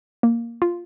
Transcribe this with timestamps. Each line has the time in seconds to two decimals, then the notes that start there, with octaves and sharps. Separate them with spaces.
0.23 A#3
0.62 F4